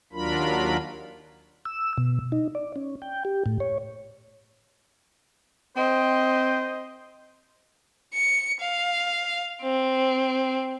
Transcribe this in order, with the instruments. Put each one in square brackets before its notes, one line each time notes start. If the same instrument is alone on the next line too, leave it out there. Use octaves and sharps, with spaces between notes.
[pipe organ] D#2 F#3 D4 F4 A#4 B5
[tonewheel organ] E6
B2
D#4
D5
C#4
G5
G4
A2
C#5
[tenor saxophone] C4 [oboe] C5 [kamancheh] D#5
[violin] C#7
F5
C4